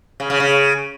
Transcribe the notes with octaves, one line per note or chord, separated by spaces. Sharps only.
C#3
C#3
C#3